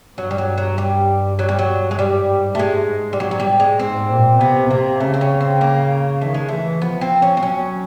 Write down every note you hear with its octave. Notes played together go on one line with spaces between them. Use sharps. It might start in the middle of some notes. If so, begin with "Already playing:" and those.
G2 F#3
G3
F#3
F#3
G3
F#3
G3
F#3
G#3
G#2 G3
A3
G#3
G3
F#3
F#3
G3
G#3
G#2 C4
A#2
C3 B3
C3 A#3
C#3 A3
C4
C#4
C4
A#3
D#3 A3
G#3
E3 A3
F3 B3
C4
C#4
C4
F#3 C#4